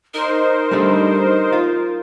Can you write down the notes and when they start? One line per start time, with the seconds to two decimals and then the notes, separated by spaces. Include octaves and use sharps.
0.14 D#4 A#4 C5
0.71 G3 A3 D4
1.53 F4